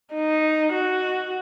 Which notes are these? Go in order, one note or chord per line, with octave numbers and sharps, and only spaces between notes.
D#4
F#4